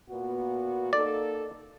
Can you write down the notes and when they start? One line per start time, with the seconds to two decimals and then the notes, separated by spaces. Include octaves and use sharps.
0.10 A#2 B3 F#4
0.93 A#3 D#4 A4 D5